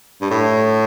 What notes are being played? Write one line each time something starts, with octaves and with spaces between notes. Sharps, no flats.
G2
A2